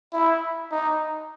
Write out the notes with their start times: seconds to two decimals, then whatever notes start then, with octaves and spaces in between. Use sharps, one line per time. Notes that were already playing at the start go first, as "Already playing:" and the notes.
0.13 E4
0.71 D#4